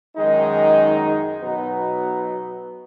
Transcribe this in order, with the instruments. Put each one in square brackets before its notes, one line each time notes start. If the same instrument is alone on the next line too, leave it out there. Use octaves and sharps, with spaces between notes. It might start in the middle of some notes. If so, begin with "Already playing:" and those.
[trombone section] F#2 D#3 G#3 D#4
B2 F#3 B3 D#4